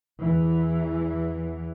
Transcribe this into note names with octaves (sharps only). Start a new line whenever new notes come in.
E2 E3